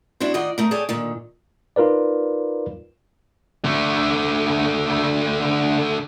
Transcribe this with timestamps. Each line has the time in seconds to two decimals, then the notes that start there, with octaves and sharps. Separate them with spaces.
0.20 D4 E4 F#4 C5
0.34 D#3 F4 D5 D#5 F#5
0.58 A3 D#4 A#4
0.71 G#4 A4 C#5 D5 G5
0.89 A#2 D3 D#3
1.76 D#4 F4 A#4 B4 D5
3.65 D3 A3